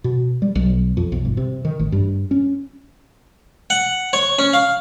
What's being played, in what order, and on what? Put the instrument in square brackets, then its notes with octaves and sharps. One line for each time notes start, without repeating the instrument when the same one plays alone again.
[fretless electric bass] B2
G3
B1
F2
B1
G1
C3
D#3
A1
G2
C#4
[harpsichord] F#5
C#5
C#4
F5